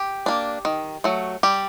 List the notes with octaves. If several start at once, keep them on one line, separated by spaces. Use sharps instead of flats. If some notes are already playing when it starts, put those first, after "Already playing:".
Already playing: G4
A#3 D4
D#3
F#3 A3
G3 G4